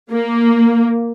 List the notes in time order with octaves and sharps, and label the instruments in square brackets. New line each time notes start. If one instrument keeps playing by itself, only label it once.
[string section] A#3